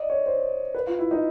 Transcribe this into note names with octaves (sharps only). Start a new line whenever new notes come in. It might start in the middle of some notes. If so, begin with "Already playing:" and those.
Already playing: D5 D#5
C#5
C5
B4
F4
E4
D#4